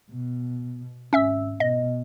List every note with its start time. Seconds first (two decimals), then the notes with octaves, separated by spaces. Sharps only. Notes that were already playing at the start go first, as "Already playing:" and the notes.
0.11 B2
1.13 G#1 C#4 E5 E6
1.60 B2 D#5